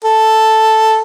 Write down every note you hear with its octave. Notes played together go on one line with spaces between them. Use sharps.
A4